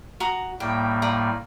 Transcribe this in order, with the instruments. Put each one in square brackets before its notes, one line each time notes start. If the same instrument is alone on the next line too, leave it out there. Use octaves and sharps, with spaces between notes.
[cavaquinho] F#4 A#5 D#6
[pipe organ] A2 G3 A#3 [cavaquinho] G5
[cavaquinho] F4 D5 A#5